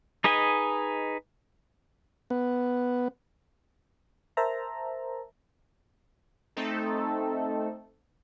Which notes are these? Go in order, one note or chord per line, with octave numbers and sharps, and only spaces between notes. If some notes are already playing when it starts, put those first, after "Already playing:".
D#4 G#4 B4 D#5 G#5
B3
A#4 C5 E5 A5 A#5
A3 C4 D#4 A4